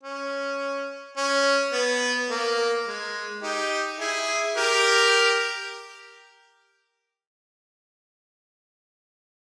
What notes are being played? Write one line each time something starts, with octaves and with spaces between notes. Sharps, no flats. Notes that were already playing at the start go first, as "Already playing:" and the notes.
C#4
C#4
B3
A#3
G#3
D#4 G4
E4 G#4
G4 A#4